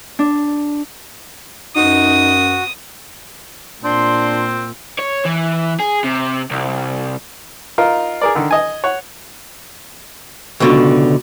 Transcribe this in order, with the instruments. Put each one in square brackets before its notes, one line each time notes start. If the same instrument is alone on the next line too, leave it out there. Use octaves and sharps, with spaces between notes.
[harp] D4
[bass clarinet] F#2 [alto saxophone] D#4 [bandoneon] F#4 [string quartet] D#6
[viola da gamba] A#2 [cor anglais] C4 [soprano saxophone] D4 [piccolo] C6
[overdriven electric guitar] C#5
E3
G#4
C3
C2
[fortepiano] D#4 F4 A#4
G#4 A#4 D5
D3 D#3
D#5 G#5
C#5 F#5
[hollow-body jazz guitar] C#2 B2 D3